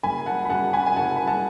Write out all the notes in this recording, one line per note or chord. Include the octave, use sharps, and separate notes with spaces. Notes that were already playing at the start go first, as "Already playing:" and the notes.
F#1 G#5 B5
F#5 A5
B5
F#2 F#5 A5
G#5 B5
G#5
F#1 F#5 A5
B5
F#5 A5